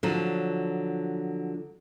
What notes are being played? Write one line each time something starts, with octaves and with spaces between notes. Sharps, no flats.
D3 F3 F#3